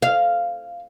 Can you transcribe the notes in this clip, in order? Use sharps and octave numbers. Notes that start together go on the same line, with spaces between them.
F5